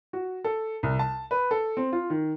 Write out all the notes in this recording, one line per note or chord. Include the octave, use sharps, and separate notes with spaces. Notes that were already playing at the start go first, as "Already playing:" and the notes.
F#4
A4
C2
A5
B4
A4
C4
F4
D#3